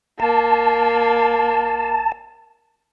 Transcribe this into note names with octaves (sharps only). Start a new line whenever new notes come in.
A#3 A5